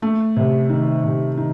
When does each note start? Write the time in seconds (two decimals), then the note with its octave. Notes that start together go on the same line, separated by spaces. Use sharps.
0.02 A3
0.36 C3
0.70 D#3
1.04 C3
1.37 D#3